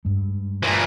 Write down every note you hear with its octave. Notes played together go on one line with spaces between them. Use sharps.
G2 G#3
A#2 E3